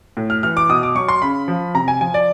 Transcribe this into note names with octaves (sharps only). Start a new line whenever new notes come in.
A2
F6
E3 F6
D6
B2 D#6
D6
F#3 C#6
C6
C#3 B5
F3
C3 A#5
G#5
F3 G#5
D5